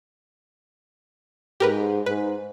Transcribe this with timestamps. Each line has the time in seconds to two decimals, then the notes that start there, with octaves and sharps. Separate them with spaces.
1.60 G#2 G4 A#4 B4
2.06 G#2 B4